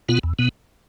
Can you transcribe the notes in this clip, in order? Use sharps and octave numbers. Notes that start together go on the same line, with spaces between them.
B2 B3 F4
E2
B2 B3